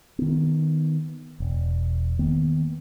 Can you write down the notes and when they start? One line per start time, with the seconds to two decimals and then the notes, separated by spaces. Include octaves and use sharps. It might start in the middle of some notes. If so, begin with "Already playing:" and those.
0.19 D#3 B3
1.40 E1
2.19 D#3 A#3 B3